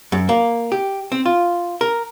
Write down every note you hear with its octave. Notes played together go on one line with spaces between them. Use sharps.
F#2
A#3
G4
C4
F4
A#4